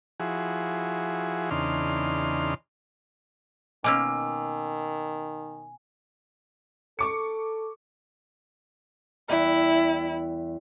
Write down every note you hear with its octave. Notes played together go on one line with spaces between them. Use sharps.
F3 E4 F#4 G#4
E2 C#3 D4 D#4 C6 F6
B2 D#3 A#3 C#4 G#5 D6 E6
A4 C#6 D6 C#7
E2 G3 E4